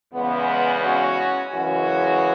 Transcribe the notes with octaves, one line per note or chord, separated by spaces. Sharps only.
E2 C#3 G#3 B3
C#4 F#4
F#2 C#3 E3 G#3 C#4 F#4